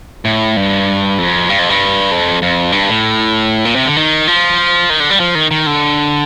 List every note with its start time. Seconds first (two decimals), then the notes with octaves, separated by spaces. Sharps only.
0.25 A2
0.57 G2
1.18 F2
1.49 G2
1.59 F2
1.70 G2
2.11 F2
2.42 F2
2.72 G2
2.88 A2
3.65 A#2
3.76 C3
3.85 D3
3.96 D#3
4.27 F3
4.90 D#3
5.00 D3
5.10 G3
5.20 F3
5.35 D#3
5.51 D#3
5.66 D3